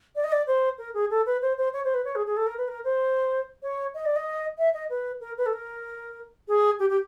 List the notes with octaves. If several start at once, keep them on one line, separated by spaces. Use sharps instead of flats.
D5
D#5
D5
C5
A#4
G#4
A4
B4
C5
C5
C#5
C5
B4
C#5
G#4
G#4
A4
A#4
B4
A#4
C5
C#5
D#5
D5
D#5
E5
D#5
B4
A#4
B4
A4
A#4
G#4
G4
G4